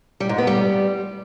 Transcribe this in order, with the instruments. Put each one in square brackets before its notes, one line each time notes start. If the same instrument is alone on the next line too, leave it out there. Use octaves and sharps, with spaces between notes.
[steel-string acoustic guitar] G3
G#2
B3
G3